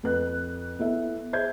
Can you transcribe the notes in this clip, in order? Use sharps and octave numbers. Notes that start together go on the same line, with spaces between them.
F2 B4 F#6
B3 E4 A4 E5
G#4 C5 E5 G6 G#6